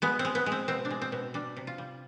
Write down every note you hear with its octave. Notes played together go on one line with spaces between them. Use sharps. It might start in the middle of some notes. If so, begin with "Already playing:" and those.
G#3 B3
C4
G#3
B3
G#3
C4
B2 C4
D4
G#3
C4
B2
G3 D4
C3
F4
G3